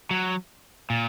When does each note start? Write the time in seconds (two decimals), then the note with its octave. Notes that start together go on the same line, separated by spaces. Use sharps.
0.11 F#3
0.90 A#2